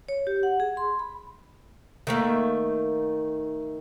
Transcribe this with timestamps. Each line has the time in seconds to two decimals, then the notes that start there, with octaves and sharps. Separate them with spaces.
0.08 C#5
0.27 G4
0.43 F#5
0.60 G#4
0.77 C6
0.99 B5
2.07 D#3 A3 A#3